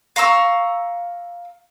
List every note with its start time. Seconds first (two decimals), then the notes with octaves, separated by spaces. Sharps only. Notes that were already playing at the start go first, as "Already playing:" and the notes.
0.16 F5 A#5 C#6 E6